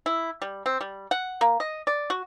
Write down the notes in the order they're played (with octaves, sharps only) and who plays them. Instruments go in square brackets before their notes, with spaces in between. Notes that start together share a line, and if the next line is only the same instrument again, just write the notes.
[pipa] E4
G3
C4
G3
F#5
A#3
D#5
D5
F#4